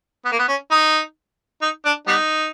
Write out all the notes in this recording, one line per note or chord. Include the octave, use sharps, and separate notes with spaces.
B3
A#3
B3
C#4
D#4
D#4
D4
G3 B3 D#4